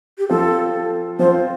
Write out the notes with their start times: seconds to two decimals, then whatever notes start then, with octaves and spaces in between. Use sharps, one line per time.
0.18 G4
0.29 F3 C4 F4 A4
1.19 F3 C4 F4 C5